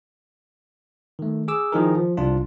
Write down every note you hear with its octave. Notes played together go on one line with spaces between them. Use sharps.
D#3 A3
G#4 D6 E6
D#3 F3 D#4 E4 G#4 A#4
F3
C2 D4 F4